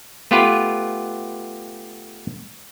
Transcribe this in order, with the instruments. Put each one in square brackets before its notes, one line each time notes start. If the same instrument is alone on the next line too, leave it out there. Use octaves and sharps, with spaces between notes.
[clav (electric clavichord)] A3 B3 F4 G4 B4